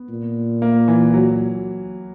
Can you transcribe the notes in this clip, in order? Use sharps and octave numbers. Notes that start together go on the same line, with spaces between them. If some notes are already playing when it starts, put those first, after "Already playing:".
Already playing: B3
A#2
A#3
E3
F#3